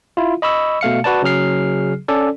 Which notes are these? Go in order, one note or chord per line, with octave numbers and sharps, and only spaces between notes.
E4 F4
D#5 B5 C#6 E6
B2 A3 F5 C#7
F#4 B4 D5 A5
C#3 F#3 G#4 F6 C7
C#4 A4 D5